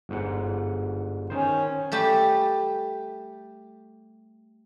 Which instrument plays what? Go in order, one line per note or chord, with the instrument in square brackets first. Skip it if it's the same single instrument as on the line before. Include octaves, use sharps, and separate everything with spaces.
[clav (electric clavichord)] G1 G#2 F#5
[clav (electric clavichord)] D#3 C5 [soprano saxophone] C#4
[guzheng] G3 A3 G4